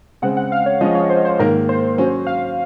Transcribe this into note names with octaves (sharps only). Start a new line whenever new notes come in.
C#3 G#3 C4 F#5
F#5
F5
C#5
F3 G#3 C#4 D#5
C#5
C5
C5
G#2 D#3 A#3 A#4
C5
F#3 C#4 F#4
F5